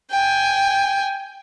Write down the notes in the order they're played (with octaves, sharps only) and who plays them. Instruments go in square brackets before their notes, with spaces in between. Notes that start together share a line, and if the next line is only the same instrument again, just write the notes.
[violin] G5 G#5